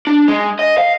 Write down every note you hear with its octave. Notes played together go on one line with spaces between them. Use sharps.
D4
G#3
D#5
F5